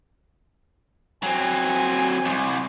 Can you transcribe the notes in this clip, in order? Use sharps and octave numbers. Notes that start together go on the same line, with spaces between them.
F#3 C4 G#5
C2 F2